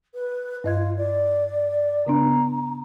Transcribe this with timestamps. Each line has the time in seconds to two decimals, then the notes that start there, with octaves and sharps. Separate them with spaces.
0.14 B4
0.64 G2 F4 D#5 G#6
0.97 D5
2.07 C#3 B3 D4 A#5